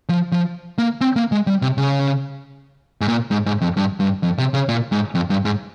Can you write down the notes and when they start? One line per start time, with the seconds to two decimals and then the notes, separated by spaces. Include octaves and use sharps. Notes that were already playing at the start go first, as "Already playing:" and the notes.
0.09 F3
0.32 F3
0.78 A#3
1.01 C4
1.16 A#3
1.32 G#3
1.47 G3
1.62 C3
1.78 C#3
3.01 G#2
3.08 A#2
3.31 G#2
3.46 G#2
3.61 F2
3.77 G2
4.00 G2
4.23 F2
4.38 C3
4.54 C#3
4.69 A#2
4.92 G#2
5.15 F2
5.30 G2
5.45 G#2